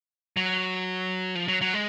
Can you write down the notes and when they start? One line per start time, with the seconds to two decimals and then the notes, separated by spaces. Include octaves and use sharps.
0.37 F#3
1.35 F3
1.48 F#3
1.61 F#3
1.74 G#3